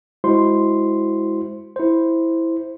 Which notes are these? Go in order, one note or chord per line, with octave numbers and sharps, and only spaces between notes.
G#3 E4 F#4 C5 C6
E4 C5